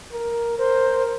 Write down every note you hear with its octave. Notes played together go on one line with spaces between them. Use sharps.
A#4
A#4 C5